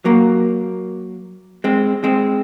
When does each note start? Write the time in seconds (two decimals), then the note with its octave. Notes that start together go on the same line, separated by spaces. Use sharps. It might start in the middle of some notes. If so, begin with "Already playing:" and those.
0.05 F#3 A#3
1.64 G#3 C4
2.04 G#3 C4